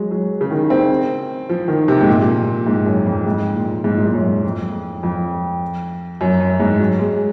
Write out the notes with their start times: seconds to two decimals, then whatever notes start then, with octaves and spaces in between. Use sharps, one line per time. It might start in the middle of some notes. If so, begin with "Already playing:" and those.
Already playing: F#3 G#3
0.11 F#3
0.41 C#3
0.51 D#3
0.70 C4
1.49 F3
1.68 D#3
1.88 C3
2.01 G#2
2.08 A#2
2.67 G#2
2.86 F#2
3.06 F2
3.26 G#2
3.55 A#2
3.84 G#2
3.97 A#2
4.05 G#2
4.14 F#2
4.45 F2
5.03 F2
6.21 F#2
6.40 F#2
6.60 G#2
6.79 F#3
6.99 G#3